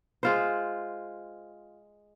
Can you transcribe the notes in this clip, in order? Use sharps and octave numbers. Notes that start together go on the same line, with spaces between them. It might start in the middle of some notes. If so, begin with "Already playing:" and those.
G#3 F4 C5